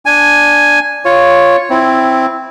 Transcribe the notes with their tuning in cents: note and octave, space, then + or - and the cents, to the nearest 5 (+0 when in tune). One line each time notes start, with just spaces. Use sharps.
D4 +0 G#5 +0
F4 +0 C#5 +0
C4 +0 E4 +0